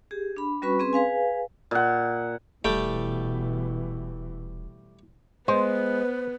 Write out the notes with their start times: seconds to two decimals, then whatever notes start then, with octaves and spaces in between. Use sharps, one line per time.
0.11 G4 G#4
0.36 D4 B5
0.62 G3 C#4 F#4 B4 B5 C#6
0.79 C4 C#4 G#4 B4 C6
0.93 G#4 B4 F5 G#5
1.71 A#2 F#5
2.65 D#1 B2 E3 G3 A3 G5
5.48 G#3 B3 B4 C5